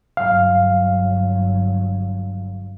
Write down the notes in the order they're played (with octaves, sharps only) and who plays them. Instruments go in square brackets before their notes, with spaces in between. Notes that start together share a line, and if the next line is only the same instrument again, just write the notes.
[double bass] G1 F#3 [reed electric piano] F5